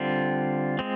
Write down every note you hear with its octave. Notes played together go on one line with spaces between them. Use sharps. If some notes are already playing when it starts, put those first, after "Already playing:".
Already playing: D3 G3 C4 F4
G#3 C4